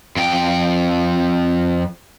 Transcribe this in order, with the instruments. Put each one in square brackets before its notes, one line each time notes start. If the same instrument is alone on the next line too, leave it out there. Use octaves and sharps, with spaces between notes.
[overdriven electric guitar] F2 G5